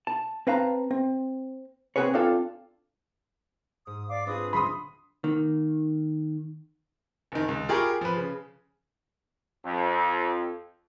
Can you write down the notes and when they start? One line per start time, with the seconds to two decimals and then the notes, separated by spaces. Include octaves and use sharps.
0.07 A5
0.47 C4 B4 F5 A5 A#5
0.91 C4
1.96 C4 F#4 G#4 B4 C#5
2.14 C4 D4 F4 A4 D5
3.87 G#2 D#6
4.08 D5 F5 D6
4.27 C4 D4 F4 G#4 B4 D#6
4.53 D3 F#3 G#3 B5 C6 D#6
5.24 D#3 A#3
7.32 F#1 D#3
7.48 C#2
7.69 F4 G4 G#4 A#4 B5 C#6
8.01 F3 B4
8.16 C#3
9.63 F2